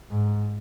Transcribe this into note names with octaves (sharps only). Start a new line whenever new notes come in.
G#2